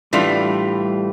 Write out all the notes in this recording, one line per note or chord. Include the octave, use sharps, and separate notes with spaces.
A2 E3 G3 A3 D4 F4